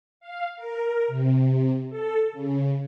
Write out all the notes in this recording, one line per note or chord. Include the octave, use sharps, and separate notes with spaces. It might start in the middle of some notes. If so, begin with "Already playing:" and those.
F5
A#4
C3
A4
C#3